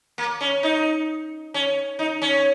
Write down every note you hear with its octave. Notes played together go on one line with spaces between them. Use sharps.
A#3
C#4
D#4
C#4
D#4
C#4